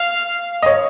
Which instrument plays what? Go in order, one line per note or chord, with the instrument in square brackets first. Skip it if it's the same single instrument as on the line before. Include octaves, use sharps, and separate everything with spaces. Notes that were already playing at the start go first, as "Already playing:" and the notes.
Already playing: [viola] F5
[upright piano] D#5
C#5